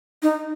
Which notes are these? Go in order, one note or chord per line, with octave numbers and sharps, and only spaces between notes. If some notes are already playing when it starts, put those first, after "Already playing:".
D#4